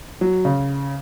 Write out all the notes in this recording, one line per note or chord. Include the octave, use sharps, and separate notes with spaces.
F#3
C#3